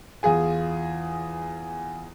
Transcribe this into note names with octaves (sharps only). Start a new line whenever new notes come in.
E2 F4 G#4 G#5